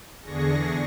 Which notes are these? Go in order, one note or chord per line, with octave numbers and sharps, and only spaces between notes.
E2 D3 D4 G#4 C#6 A#6